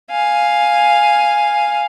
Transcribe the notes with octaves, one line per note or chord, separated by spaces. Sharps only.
F5 G#5